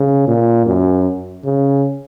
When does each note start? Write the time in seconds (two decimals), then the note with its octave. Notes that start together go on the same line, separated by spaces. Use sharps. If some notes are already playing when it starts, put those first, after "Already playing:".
Already playing: C#3
0.27 A#2
0.67 F#2
1.45 C#3